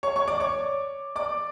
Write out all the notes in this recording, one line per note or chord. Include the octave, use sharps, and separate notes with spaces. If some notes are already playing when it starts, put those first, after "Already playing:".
C#5 C#6
C#5 C#6
D5 D6
C#5 C#6
D5 D6